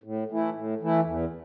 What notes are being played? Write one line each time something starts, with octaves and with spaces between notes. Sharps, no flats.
A2
E3 A3 E4
A2
E3 A3 E4
E2